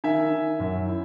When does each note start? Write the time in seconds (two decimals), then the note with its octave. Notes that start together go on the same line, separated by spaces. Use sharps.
0.04 D#3 E5 G#5
0.32 D#3
0.60 F#2
0.87 E4